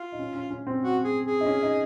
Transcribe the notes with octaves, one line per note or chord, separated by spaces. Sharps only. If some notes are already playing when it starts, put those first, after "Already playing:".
Already playing: F4
D#4
C#4
C#4
C#4
C4
F#4
G#4
G#4
D#4
C#4
D#4